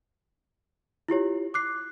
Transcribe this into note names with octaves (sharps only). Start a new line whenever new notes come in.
E4 F4 G4 C#5
D6 F#6 C7